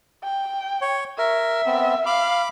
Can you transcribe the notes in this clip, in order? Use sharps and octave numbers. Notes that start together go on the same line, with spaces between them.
G5
C#5
A#4 E5
B3 C4
F5 B5 D6